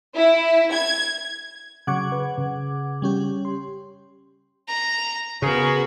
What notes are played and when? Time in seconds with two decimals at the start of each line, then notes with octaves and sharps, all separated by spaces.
0.16 E4
0.72 G#6
1.87 C#3 F#3 F#5 C#6 D6 G#6
2.12 B4
2.38 C#3
3.02 G3 C#4 G4
3.45 C6
4.69 A#5
5.42 C#3 B3 C#4 F#4 G#4 A#4